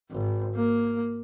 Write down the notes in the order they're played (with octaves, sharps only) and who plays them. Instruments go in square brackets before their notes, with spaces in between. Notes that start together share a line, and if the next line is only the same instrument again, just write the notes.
[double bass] G#1
A#3